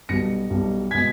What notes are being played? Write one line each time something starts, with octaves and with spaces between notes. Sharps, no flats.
B1 B2 G3 A#6 C#7
B1 B2 G3
B2 G#3 G#6 B6